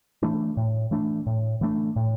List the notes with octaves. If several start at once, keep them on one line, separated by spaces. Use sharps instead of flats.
E3 A3 D4
A2
E3 A3 D4
A2
E3 A3 D4
A2